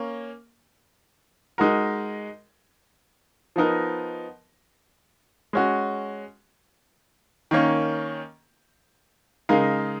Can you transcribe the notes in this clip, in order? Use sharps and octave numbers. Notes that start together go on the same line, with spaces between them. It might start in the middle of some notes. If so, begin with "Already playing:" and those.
Already playing: A#3 C#4
G#3 D#4 F#4 A#4
F3 B3 D#4 A#4
G#3 C#4 F#4
D#3 A#3 C#4
C#3 G#3 D#4 A#4 F5